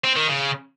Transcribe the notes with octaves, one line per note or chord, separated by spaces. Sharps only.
C4
D#3
C#3